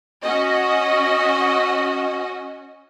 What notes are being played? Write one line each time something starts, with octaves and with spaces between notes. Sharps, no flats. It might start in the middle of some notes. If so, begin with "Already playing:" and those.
C#4 F#4 D#5